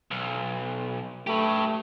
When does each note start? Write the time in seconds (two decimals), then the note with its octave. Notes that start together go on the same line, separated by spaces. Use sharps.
0.11 B1
1.27 A3 G4 B4